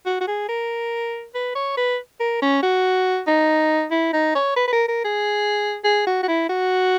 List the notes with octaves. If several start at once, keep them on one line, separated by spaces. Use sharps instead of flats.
F#4
F#4
G#4
A#4
B4
C#5
B4
A#4
C#4
F#4
D#4
E4
D#4
C#5
B4
B4
A#4
A#4
G#4
G#4
F#4
F#4
E4
F#4